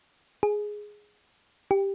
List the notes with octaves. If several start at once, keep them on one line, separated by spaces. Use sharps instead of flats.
G#4
G4